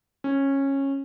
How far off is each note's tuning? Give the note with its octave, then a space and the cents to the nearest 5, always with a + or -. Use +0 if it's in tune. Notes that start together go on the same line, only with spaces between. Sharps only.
C#4 -15